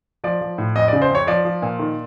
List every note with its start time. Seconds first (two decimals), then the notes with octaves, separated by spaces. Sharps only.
0.24 F3 D5
0.41 F3
0.58 A2
0.76 F2 D#5
0.88 C#3 D5
1.02 C5
1.11 F2 C#5
1.27 F3 D5
1.45 F3
1.62 A#2
1.79 D#3